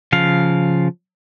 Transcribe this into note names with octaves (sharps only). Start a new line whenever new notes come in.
C#3 F3 F5